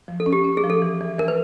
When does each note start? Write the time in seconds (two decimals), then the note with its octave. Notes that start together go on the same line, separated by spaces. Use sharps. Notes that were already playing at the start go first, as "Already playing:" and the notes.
0.08 F3
0.20 A4
0.26 C#4
0.33 G4
0.44 C#4
0.57 G#4
0.64 F3
0.70 A4
0.82 E3
1.00 E3
1.18 E3 A#4
1.28 B4